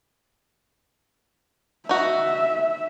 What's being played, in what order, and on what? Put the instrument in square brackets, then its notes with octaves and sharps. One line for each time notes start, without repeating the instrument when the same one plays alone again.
[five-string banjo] D#4 F#4 [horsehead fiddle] E5